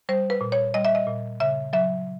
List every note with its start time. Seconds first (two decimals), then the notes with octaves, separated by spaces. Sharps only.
0.09 G3 C5
0.30 B4
0.41 A#2
0.52 C#5
0.74 G3 D#5
0.85 E5
0.95 D#5
1.07 A#2
1.40 C#3 E5
1.73 F#3 E5